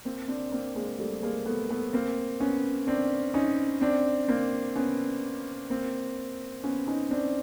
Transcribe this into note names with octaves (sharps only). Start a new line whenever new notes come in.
A#3 C4
C4 D4
A#3 C4
G#3 A#3
G3 A3
G#3 A#3
A3 B3
A3 B3
A#3 C4
B3 C#4
C4 D4
C#4 D#4
C4 D4
A#3 C4
B3 C#4
A#3 C4
B3 C#4
C#4 D#4
C4 D4